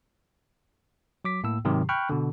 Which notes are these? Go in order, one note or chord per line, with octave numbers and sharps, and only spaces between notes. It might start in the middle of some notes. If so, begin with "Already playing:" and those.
F#3 D6 B6
A2 A#3 E6
G#2 C3 D#3 F#3 G4
G5 B5 C#6 F6 F#6
B2 D3